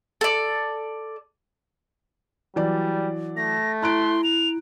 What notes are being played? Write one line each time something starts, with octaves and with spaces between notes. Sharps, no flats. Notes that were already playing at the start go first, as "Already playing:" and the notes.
A4 D5
E3 F#3 G3 D5
A3 A#6
E4 A#5 C6 F#6 D7
F7